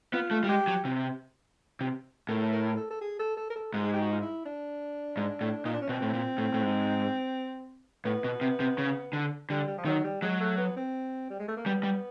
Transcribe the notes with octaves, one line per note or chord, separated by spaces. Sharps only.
B3 F4
A3
G3
G#3 G4
F#3
C3
C3
A2 A#4
A#4
A4
A4
G#4
A4
A4
A#4
A4
G#2 G#4
G#4
G4
F#4
F4
E4
D4
G#2
A2
A#2 D#4
D4
C#4
B2 C4
A2
A#2
A2
A2
G#2
A2 B3
B2
C3
C3
C#3
D3
D3 G3
G3
F3
D#3 F#3
G3
F#3 G#3
A3
B3
C4
G3
G#3
A3
A#3
G3 B3
G3